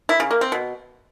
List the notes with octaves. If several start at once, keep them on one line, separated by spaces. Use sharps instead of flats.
E4
C#3
A#3
C4
B2